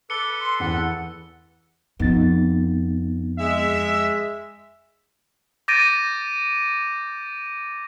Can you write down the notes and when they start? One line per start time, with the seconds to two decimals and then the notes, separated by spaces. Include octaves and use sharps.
0.10 A4 B4 D6 C#7 G7
0.41 C6
0.60 E2 F#5
2.00 F2 B3 D#4 A6
3.39 G#3 E5
5.68 D6 G6 A6 A#6 D7 D#7